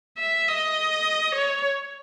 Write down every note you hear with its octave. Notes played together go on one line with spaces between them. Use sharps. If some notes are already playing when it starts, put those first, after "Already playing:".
E5
D#5
C#5